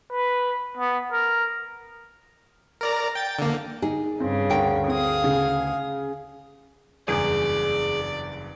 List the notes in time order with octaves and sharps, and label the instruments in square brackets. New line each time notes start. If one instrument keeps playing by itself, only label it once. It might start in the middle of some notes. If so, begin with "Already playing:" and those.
[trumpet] B4
B3
A#4
[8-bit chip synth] A#4 D5 A#5
G5 A6
D3 A#3
[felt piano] D#4 [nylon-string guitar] G#4
[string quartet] G2 C#3 [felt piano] C4
[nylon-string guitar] D2 A#4 G5
[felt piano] C4 [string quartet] G#4 F5 D#6
[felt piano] C#3
[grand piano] F#1 E2 G2 [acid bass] G#4 [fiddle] D5